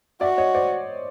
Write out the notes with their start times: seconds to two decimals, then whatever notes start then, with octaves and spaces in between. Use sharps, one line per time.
0.21 F#4 D5 E5
0.38 C#5 D#5
0.55 C5 D5